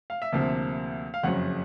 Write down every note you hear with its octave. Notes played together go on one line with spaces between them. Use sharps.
F5
E5
D2 C3 F3 A#3
F5
F#1 F2 C#3 F#3 F#5